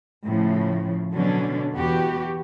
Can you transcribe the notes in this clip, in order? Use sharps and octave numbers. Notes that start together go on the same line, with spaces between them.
A2 C#3 F3
B2 D3 F#3 C#4 D4
E2 B3 F#4 G4